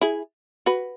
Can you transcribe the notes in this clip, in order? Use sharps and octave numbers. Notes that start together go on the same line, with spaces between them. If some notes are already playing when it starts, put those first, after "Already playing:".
E4 G#4
F#4 B4